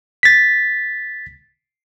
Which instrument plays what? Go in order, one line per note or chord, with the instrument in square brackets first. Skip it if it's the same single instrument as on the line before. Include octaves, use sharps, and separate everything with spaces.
[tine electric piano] A6 B6